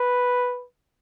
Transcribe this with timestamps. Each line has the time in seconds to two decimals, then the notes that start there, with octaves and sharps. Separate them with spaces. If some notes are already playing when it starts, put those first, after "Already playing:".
Already playing: B4